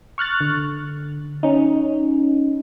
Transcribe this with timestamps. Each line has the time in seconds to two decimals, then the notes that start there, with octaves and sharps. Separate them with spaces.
0.18 C#6 F6 F#6 A6
0.41 D3
1.43 C#4 D#4